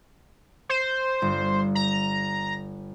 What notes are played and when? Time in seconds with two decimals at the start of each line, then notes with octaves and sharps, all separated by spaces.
0.69 C5
1.22 G1
1.75 A#5